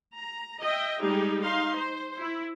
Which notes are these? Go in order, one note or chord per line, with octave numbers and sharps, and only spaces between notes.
A#5
D#5 E5 G5
G3 G#3 D#4 G4 G#4
D#4 F5 C6
C5
E4